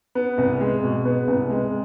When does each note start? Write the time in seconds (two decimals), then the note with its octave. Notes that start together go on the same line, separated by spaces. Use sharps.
0.15 B3
0.38 C2
0.61 G#3
0.83 B2
1.05 B3
1.27 C2
1.50 G#3